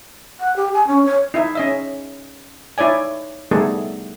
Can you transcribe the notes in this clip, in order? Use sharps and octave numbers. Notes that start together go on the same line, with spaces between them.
F#5
G4
G#5
C#4
C#5
D#4 E4 E5
C#4 D#5 E5
D#4 E4 C#5 D5 G#5
G3 A3 B3 D#4 G#4 A4